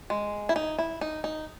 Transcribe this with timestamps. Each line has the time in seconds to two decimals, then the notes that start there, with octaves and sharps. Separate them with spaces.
0.10 G#3
0.49 E4
0.56 D#4
0.78 E4
1.01 D#4
1.24 D#4